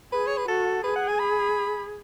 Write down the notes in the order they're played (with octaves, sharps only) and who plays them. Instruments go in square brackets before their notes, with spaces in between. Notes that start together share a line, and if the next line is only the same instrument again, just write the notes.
[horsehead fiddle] G#4 [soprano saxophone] B4
[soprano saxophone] C#5
B4
[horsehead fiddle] F#4 [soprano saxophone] A4
[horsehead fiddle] G#4 [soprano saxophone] B4
[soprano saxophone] F#5
G#5
B5